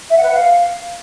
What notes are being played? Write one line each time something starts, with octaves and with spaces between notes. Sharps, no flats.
E5
F#5
B4
F#5
F5